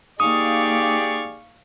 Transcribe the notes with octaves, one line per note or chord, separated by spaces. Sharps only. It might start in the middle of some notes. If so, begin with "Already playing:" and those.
A#3 D#4 G4 G#4 D5 F5 C#6 D#6